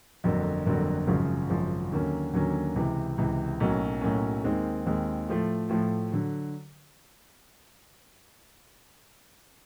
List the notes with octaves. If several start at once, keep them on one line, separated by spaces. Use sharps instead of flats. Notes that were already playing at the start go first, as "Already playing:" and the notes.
G1 F2 D3 F#3 A#3
G1 F2 D3 F#3 A#3
G#1 F#2 C#3 F3
G#1 F#2 C#3 F3
D#2 D3 F#3 A#3 C#4
D#2 D3 F#3 A#3 C#4
C#2 C3 E3
C#2 C3 E3
B1 A2 F#3 A#3 C#4
B1 A2 F#3 A#3 C#4
D#2 D#3 G#3 C4
D#2 D#3 G#3 C4
A2 F3 A3
A2 F3 A3
D3 F#3